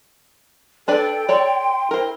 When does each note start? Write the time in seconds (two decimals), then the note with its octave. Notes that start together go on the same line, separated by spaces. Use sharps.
0.88 D4 A4 B4 D5 G5
1.29 A4 C#5 D5 C6
1.91 E4 A#4 C5